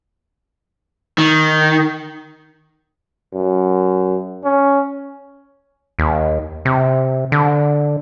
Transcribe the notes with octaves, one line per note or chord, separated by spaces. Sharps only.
D#3
F#2
C#4
D#2
C3
D3